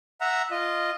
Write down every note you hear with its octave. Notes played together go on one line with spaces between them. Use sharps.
E5 F#5 A#5
F4 D#5